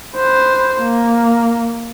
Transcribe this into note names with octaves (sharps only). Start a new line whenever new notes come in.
B4 C5
A#3